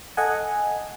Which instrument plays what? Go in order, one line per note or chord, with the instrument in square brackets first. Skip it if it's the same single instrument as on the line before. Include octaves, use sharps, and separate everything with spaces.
[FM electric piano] A4 D#5 F#5 G#5